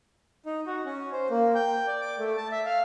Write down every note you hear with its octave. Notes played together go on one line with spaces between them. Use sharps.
D#4
F#4
C#4
C5
A#3
G5
D5
D6
A3
A5
E5
F5